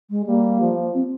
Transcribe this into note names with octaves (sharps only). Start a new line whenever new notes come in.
G#3
G3 A#3
F3
C4